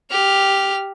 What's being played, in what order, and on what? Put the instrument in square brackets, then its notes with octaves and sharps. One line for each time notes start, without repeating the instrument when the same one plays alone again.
[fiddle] G4 F6